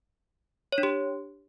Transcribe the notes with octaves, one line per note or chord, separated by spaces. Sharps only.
C#5
D4
G4